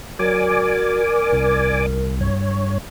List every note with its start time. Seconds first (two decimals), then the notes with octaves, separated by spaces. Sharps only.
0.19 F#3 A#4 D5 G#5 D6
1.32 C2
2.21 G2 C#5